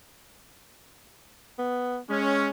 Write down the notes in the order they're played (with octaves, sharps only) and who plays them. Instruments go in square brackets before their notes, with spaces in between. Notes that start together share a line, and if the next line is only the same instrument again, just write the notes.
[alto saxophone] B3
[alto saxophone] G#3 [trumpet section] C#4